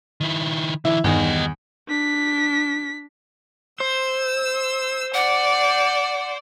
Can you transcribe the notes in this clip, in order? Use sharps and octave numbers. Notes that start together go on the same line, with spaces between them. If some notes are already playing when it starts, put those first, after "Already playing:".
D#3 E4
D3 E3 E4
E2 G2 D#3 G4 D#5
D4 B6
C5 E6
D5 F#5